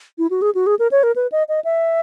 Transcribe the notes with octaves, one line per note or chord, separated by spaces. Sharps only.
E4
F#4
G#4
F#4
G#4
A#4
C#5
A#4
B4
D#5
D#5
E5